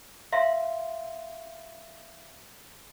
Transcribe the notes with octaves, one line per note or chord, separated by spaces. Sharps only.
E5 F5 C6